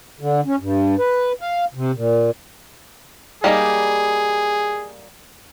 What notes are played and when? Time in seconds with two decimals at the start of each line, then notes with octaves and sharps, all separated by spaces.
0.20 D3
0.46 C#4
0.60 G2
0.99 B4
1.41 F5
1.75 C3
1.94 A#2
3.44 G3 A#3 D#4 G#4